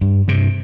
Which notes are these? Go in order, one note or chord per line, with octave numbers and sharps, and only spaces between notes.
G2
G2 C3